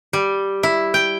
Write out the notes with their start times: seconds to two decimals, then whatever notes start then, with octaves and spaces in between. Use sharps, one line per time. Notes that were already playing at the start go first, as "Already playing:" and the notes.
0.13 G3
0.63 E4
0.94 G5